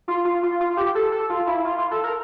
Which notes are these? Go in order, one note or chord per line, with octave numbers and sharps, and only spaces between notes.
F4
F4
F4
F4
G4
A4
A4
F4
E4
F4
F4
A4
A#4